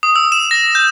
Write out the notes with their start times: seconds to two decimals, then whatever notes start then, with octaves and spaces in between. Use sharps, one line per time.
0.03 D#6
0.16 E6
0.32 E7
0.51 A#6
0.75 G6